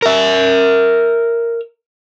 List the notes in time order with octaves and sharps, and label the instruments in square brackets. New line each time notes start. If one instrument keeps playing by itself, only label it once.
[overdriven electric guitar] A#4 E5